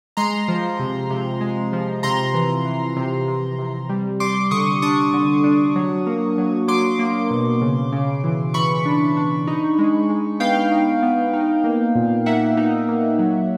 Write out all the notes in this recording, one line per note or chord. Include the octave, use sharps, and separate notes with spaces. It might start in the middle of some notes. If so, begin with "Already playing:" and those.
G#3 A#5 C6
F3
C3
C3
G#3
F3
C3 A#5 C6
E3
E3
C3
C3
C3
G3
G3 C6 D6
D3 C#6 D#6
D4 C#6 D#6
D3
D4
F#3
A#3
F#3
F#3 C6 D6
A#3
B2
C#3
C#3
E3
E3 B5 C#6
D4
D4
D#4
G#3
G#3
B3 F5 G5
D#4
B3
D#4
A#3
A#2
A#3 E5 F#5
D#4
A#3
F#3